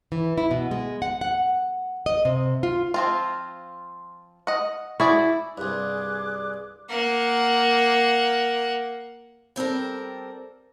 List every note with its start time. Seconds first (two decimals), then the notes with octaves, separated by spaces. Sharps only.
0.12 E3
0.38 E4
0.51 B2
0.71 G#3
1.02 F#5
1.21 F#5
2.06 D#5
2.25 C3
2.63 F4
2.94 F3 C4 F4
4.47 D#5 F#5
5.00 E4 F#4 G#4 D5
5.58 C2 G2 G#4 D5 D6 F#6
6.89 A#3 F#5
9.56 G3 C4 A4 A#4